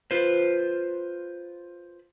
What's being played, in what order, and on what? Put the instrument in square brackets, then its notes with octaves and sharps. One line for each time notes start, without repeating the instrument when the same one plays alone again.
[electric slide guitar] F4 B4 C5